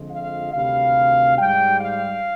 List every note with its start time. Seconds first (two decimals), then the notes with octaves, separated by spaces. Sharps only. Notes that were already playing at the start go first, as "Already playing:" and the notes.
Already playing: F2 D3 F3 G#3
0.11 F5
0.53 D2 C3 D#3 G3 F5
1.37 G#2 G3 G5
1.80 F5